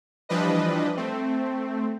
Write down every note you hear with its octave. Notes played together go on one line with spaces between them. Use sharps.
E3 F3 G3 D4 B4 D#5
A3 C4